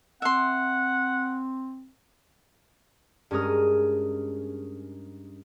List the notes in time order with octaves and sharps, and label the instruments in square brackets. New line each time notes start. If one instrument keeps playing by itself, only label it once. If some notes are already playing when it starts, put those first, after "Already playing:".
[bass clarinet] C4 [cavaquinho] E5 C6 [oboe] F#5
[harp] G2 G#3 C#4 A#4 D#6 F6